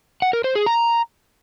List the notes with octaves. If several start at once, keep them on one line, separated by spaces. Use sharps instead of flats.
F#5
A#4
C5
G#4
A#5